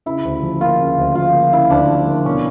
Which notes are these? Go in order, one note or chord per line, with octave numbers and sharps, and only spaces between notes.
C#3 E4
D2
F3
A#3 F4
C#3
D2
F3 F4
A#3
C#3 E4
D2 D4
F3
A#3
B2 C#4